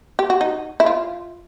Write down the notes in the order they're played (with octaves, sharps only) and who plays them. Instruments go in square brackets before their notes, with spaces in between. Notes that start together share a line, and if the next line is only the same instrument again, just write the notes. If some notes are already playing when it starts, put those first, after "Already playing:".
[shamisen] G4
F#4
D#4
E4
F4